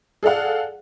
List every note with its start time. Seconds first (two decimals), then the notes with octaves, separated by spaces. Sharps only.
0.23 G#4 A4 D5 F5 F#5